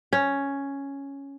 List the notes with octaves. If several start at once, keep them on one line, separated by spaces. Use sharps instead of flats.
C#4